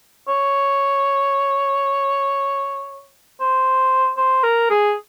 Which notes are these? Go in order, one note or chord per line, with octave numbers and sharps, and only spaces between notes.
C#5
C5
C5
A#4
G#4